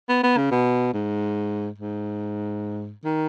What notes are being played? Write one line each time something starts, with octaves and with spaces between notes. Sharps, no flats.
B3
B3
C#3
B2
G#2
G#2
D#3